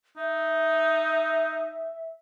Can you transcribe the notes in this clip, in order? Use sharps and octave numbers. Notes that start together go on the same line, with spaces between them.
D#4 E5